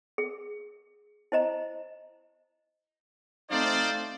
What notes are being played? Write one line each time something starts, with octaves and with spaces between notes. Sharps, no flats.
G#4
E4 C5 D#5 A#5
A3 C4 D#4 C5 D5 F5